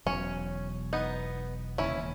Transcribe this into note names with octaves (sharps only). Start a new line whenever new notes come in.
E1 E2 B2 F#3 C#4
B3 D#4
E1 D#2 C#3 C#4 E4